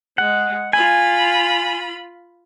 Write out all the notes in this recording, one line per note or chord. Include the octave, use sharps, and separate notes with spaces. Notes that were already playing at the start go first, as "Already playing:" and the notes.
G#3 F#5
F4 G#5 B5